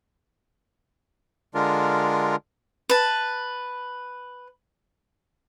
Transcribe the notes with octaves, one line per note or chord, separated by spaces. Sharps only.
D3 G#3 D4 F4 A#4
B4 A5